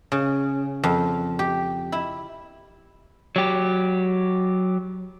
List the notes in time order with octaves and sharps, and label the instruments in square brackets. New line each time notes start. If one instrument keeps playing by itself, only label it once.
[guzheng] C#3
F2
G4
E4
[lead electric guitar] F#3 G4